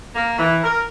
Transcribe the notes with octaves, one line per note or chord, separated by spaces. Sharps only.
A#3
E3
A#4